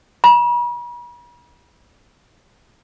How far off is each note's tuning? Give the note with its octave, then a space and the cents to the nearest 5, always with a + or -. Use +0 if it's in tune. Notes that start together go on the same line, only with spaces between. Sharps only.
B5 -45